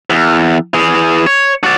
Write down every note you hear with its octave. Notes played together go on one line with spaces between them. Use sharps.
E2
E3 G#4
C#5
F#4 D5